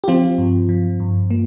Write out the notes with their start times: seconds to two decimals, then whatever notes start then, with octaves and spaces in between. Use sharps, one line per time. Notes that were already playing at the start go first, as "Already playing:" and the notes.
0.04 G4
0.08 F3 C4 F4
0.38 G2
0.69 F3
1.00 G2
1.30 A#3